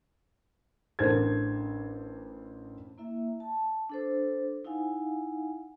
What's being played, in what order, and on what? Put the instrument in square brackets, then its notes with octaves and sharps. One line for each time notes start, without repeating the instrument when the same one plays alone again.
[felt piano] A1 D4 A4 A#4 C5 G#6
[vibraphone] A#3 E4 E5
A5
D4 A4 C5
D#4 E4 F5 F#5 G#5